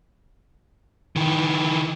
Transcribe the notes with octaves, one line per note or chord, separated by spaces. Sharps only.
D#3 E3